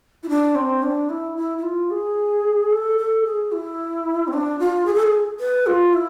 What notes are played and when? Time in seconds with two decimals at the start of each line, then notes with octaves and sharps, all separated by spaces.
0.23 E4
0.29 D4
0.55 C4
0.83 D4
1.09 E4
1.37 E4
1.58 E4
1.63 F4
1.91 G#4
2.71 A4
2.98 A4
3.25 G#4
3.52 E4
4.28 C4
4.33 D4
4.59 F4
4.86 G#4
4.95 A4
5.03 G#4
5.40 B4
5.67 F4
5.93 E4